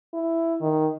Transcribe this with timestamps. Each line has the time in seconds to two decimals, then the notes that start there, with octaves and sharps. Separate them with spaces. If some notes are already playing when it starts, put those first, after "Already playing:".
0.14 E4
0.61 D#3